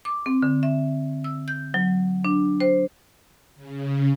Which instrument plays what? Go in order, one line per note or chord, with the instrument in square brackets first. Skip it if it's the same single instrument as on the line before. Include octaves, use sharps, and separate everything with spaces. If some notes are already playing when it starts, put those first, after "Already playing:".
[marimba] D6
C4
D3
E5
E6
G6
F#3
D4
C5
[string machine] C#3